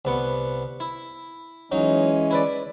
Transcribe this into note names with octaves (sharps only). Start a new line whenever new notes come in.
C2 B3 F#5
E4
E3 F#3 G#3 C#4 D#4
E4 B4 D5